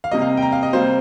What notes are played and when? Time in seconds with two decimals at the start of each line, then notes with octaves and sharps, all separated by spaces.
0.04 F5
0.11 C3 G3 A#3 D#5
0.22 F5
0.37 G5
0.42 A#5
0.52 F5
0.63 D#5
0.73 C3 G3 A#3 C5